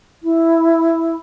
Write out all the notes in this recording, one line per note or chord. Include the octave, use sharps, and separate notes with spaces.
E4